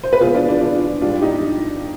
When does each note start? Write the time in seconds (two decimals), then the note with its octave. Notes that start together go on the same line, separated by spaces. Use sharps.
0.04 C5
0.13 B4
0.21 B2 G#3 F4 G#4
0.35 D4 F4
0.48 D4 F4
0.61 D4 F4
1.02 G#2 G3 D4 F4
1.22 D#4 G4